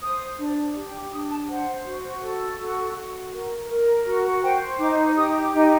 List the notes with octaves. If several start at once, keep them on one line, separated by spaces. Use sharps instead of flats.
C5 D#6
D4
G4
D6
D4 D#6
A5
C5 F#5
F#4
A4
F#4
F#4
A#4
A#4
F#4
C5 G5
D#4 D6
G4 D#6
D6
D#4